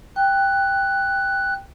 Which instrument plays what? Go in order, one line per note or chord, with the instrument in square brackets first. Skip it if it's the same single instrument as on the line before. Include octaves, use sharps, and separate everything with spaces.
[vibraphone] G5 [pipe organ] F#6